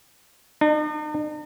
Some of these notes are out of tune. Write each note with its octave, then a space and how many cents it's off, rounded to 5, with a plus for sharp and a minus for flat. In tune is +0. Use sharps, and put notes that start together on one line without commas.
D#4 -45